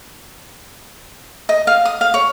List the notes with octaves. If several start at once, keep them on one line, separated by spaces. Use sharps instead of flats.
D#5
F5
D#6
F5
C#5